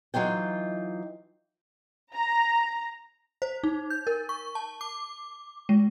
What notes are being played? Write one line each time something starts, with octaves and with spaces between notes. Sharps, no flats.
E3 F#3 D#4 F4 G5
A#5
C5
D#4
G6
A#4
C#6
A5
D6
G#3